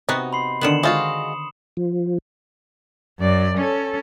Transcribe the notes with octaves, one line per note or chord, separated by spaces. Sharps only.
C3 B3 D#4 F#4
B5 C6 C7
D3 D#3 B3 C#7 E7 F#7
G#3 F4 F#4 C5 D#6
F3
F#2 D5
C#4 A4